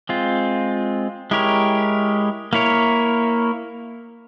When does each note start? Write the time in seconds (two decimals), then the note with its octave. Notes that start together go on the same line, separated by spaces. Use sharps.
0.09 G#3 C4 F4
1.31 G#3 E4 G4 A#4 C#5
2.53 A#3 E4 A#4 C#5